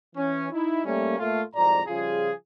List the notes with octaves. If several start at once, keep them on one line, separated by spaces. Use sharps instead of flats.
E3 C#4
D#4 E4
G3 A3 A#3 C#4
A#2 A3 F4
C2 F2 G#2 D5 A#5
C#3 F3 G3 F4 G#4